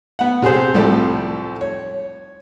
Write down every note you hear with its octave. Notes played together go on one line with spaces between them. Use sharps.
B3 F#5
C3 G#4 A4 C5
C2 A2 F3 G3 C4 A4
C#5